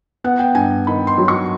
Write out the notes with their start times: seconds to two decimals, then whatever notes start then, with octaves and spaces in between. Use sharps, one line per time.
0.24 B3 F#5
0.39 G5
0.55 G2 G#5
0.87 D#3 B5
1.07 C6
1.18 F#3
1.28 C#6